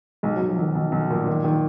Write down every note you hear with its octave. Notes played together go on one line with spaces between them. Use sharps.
B1 G#3
F#3
B1
F3
B1 D#3
B1
B1
A#2
D#3
D#3